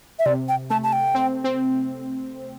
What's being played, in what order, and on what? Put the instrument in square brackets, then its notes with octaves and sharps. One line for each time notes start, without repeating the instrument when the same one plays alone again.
[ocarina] E5
[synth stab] C3 [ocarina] D5
[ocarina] G5
[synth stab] A3 [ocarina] A5
[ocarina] A5
G5
[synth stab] C4
C4